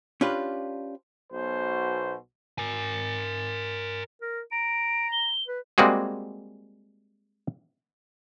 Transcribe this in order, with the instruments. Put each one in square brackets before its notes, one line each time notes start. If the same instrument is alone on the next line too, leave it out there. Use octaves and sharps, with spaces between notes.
[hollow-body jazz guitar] C#4 D4 F4 G4 B4
[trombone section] B1 B2 C5
[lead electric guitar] A#4 G#5
[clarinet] A#4
[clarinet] A#5 [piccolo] D7
[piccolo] G7
[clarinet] B4
[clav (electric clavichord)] G3 G#3 A#3 C4 F#4 G#4